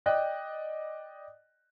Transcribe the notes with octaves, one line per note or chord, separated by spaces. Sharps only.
D5 D#5 G5 F#6